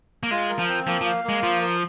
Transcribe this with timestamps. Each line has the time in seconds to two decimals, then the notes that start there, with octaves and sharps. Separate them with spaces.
0.23 A#3
0.31 G#3 F4
0.49 A#4
0.59 F3
0.69 C4
0.87 F3 A#3
1.01 F3
1.06 F5
1.24 G#3 A#3
1.42 F3 F4
1.62 A#4